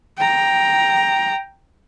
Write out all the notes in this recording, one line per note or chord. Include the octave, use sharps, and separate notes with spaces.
G5 A#5